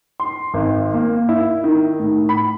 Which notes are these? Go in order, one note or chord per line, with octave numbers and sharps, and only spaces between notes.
C6
G#1
A#3
E4
D#3
A2
B5